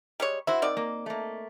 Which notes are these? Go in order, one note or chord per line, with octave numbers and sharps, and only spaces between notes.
G3 G#3 C#5
E4 F#4 C5 E5
D#3 C4 D5
A#3
A3 A#3